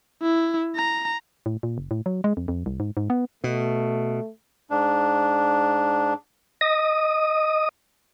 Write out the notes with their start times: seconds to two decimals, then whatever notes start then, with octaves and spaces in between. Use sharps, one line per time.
0.22 E4
0.75 A#5
1.46 A2
1.63 A#2
1.78 F#1
1.91 A2
2.06 F#3
2.24 G#3
2.37 F2
2.48 F2
2.66 C2
2.80 G#2
2.97 G#2
3.10 B3
3.44 B2 A3
4.70 G#2 D4
6.61 D#5 D#6